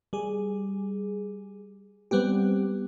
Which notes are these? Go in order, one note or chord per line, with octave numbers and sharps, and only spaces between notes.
G3 G#4
G3 B3 C4 G4